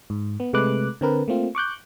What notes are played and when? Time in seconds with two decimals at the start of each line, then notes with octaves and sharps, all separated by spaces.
0.10 G#2
0.40 B3
0.53 C3 G#3 A3 B4 D6 F#6
1.01 D3 C4 A#4 B4
1.28 A3 A#3 C4 F4
1.55 C#6 D6 F#6 G6